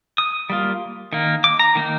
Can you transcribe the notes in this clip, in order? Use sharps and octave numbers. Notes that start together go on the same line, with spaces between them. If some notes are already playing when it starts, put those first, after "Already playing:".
D#6
G3 A#3 F4
D#3 A#3
D6
A#5
D#3 A#3 D#4